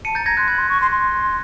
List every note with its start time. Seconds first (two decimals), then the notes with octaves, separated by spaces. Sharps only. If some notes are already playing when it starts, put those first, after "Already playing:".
0.05 A5 C#7 D#7
0.15 A#5 G6 A6
0.26 A#5 G#6 A#6
0.37 C6 F#6 G#6
0.48 B5 F#6 G#6
0.58 C6
0.69 C#6
0.80 C6
0.91 C6